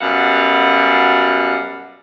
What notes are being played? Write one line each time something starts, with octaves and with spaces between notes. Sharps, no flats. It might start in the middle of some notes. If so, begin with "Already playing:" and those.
F#2 B2 G3 F5 F#5